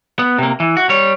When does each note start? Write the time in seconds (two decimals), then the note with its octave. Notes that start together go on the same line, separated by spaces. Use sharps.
0.19 B3
0.39 C3 A#3
0.60 E3
0.77 F#4
0.89 G3 C#5